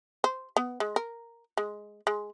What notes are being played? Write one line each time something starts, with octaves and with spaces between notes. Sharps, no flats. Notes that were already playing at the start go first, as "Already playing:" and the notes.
C5
B3
G#3
A#4
G#3
G#3